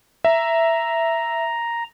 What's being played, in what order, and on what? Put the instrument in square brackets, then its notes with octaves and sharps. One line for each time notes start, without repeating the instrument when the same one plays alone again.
[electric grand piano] E5 [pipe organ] A#5